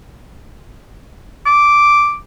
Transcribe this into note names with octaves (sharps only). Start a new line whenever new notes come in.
D6